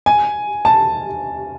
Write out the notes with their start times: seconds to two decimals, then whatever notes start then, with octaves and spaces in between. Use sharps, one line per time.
0.06 G#5
0.65 A5